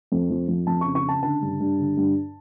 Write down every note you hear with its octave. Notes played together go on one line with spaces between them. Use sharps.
F2
F3
F2
F2 A5
C#3 C#6
C#6
C#3 A5
D3 A5
G2
G2
D3
G2